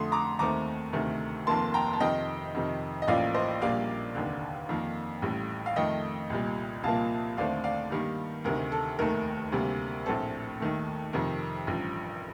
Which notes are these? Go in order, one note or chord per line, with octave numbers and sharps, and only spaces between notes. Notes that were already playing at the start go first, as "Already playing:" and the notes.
Already playing: F2 D3 A3 C6 D#6
A#5 D6
D#2 D#3 A3 C4 A#5 D6
D2 C3 D#3 A3
F1 F2 D#3 A#3 A5 C6
G5 A#5
A5
F2 C3 D#3 D#5 G5
F2 C3 D#3
D#5
A1 A2 F3 A#3 D5 F5
C5 D#5
A#1 A#2 G3 A#3 D5 F5
F1 D#2 D3
F2 D#3 A#3
A1 A2 G3
F5
F2 D#3 A3 D#5 G5
C2 A#2 G3
C2 A#2 F3 A#3 F5 A5
D#2 D3 A3 C4 D5 F5
D5 F5
G2 D#3 G3 A#3
D2 C3 D#3 A#4
A4
F1 D#2 D#3 A3 A#4
D2 C3 G3 A#3
A#1 A2 A3 C4 A4
D#2 D#3 A3
F2 C3 D#3 A#4
A1 G2 F3